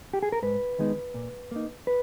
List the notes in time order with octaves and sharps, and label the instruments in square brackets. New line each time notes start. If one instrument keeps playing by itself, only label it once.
[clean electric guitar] G4
G#4
A#4
G#2 B4
D#3 G#3 B3 D#4
A#2
A#3 D#4
B4